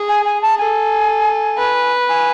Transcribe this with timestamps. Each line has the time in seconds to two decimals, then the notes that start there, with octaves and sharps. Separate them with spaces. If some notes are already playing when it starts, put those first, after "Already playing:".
Already playing: G#4
0.08 G#5
0.25 G#5
0.42 A5
0.58 A4 G#5
1.57 B4
2.09 G#5